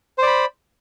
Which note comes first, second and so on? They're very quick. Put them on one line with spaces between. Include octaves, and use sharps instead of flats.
C5 D5 B5